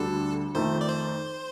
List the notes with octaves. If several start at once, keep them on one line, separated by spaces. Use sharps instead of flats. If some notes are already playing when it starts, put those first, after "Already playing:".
Already playing: D2 D3 G3 D4 A4
F2 D#3 A3 C5
D5
C5